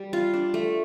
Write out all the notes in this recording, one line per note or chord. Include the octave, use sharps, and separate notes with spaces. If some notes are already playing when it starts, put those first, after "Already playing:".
Already playing: G3
F4
D4
A3